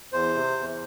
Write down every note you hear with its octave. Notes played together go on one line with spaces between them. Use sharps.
E2 C5
C3
E2